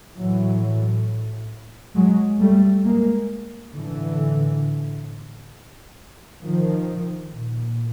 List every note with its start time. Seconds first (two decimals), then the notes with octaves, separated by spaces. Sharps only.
0.16 A2 E3 F#3
1.95 F#3 G#3
2.40 G3 A3
2.85 G#3 A#3
3.74 A2 D3 E3
6.42 D#3 F3
7.32 A#2